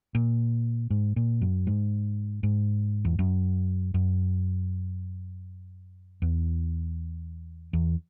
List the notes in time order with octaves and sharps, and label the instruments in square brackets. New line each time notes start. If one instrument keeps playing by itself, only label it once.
[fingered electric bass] A#2
G#2
A#2
F#2
G#2
G#2
E2
F#2
F#2
E2
E2